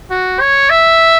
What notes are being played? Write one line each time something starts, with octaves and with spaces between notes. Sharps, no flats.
F#4
C#5
E5